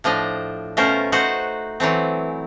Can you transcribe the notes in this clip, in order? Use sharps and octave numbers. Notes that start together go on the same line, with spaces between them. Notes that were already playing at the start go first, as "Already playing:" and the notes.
A2 F3 D4 D#5
B2 A3 C#4 F4 A#4 C5
A3 D#4 F#4 C5 F#5
E3 F#3 A3 C4